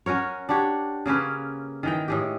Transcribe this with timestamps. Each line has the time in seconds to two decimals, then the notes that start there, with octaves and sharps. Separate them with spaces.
0.06 C#4 F#4 A#4 C#5
0.49 D4 F#4 G4 C#5
1.06 C#3 A#3 C#4 B4
1.83 D#3 E3 G5
2.08 A2 G#3 G4